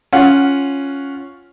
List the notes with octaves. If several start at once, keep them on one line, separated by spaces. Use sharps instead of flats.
C#4 F4 F#5